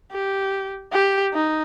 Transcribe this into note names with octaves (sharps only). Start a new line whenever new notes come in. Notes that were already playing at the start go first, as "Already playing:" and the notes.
G4
G4
D#4